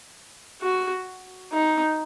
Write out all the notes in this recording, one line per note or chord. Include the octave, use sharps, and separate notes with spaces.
F#4
D#4